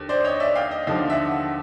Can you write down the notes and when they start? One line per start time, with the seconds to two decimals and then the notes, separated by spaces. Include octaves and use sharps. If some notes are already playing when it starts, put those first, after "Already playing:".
Already playing: D#2 D3
0.09 C5 D5
0.24 C#5 D#5
0.40 D5 E5
0.55 F5 G5
0.71 D#5 F5
0.87 D#2 D3 F3 D#5 F5
1.10 E5 F#5